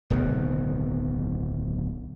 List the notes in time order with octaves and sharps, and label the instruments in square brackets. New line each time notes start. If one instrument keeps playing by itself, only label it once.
[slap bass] D1 B1 D#3 B3